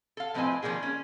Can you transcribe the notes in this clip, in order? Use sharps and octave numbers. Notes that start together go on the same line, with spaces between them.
A4 F5
A2 F3 C4 B4 D#5 G#5
D#3 F3 G3 A#3 G#4
C#4